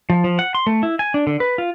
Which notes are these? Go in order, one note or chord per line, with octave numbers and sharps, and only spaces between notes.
F3
F3
F#5
C6
A3
E4
G#5
D4
D3
B4
F4